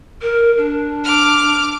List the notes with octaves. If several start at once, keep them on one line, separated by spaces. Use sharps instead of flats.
A#4
D4
D6 F6